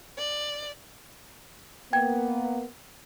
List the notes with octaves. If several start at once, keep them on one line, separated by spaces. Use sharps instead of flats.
D5
A#3 B3 G5 G#6